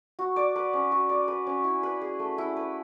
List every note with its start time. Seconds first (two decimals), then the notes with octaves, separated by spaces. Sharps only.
0.19 F#4
0.36 D5
0.56 B4
0.73 C#4
0.92 F#4
1.09 D5
1.28 B4
1.47 C#4
1.64 E4
1.83 B4
2.01 G#4
2.19 A3
2.38 E4
2.56 B4